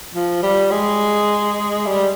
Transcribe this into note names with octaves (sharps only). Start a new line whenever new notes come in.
F3
G3
G#3
G3